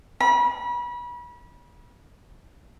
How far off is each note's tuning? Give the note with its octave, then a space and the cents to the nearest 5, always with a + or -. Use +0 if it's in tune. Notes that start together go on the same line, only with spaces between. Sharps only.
B5 -35